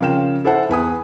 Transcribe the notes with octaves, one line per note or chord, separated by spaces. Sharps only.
C#3 F3 A#4 F5 G5 E7
E4 A4 C5 E5 F#5 A5
E2 B4 G#5 D#6